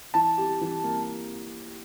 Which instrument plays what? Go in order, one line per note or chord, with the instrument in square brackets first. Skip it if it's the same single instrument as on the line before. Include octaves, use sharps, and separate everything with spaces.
[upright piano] E3 [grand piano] A5
[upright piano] G4
E3
A#3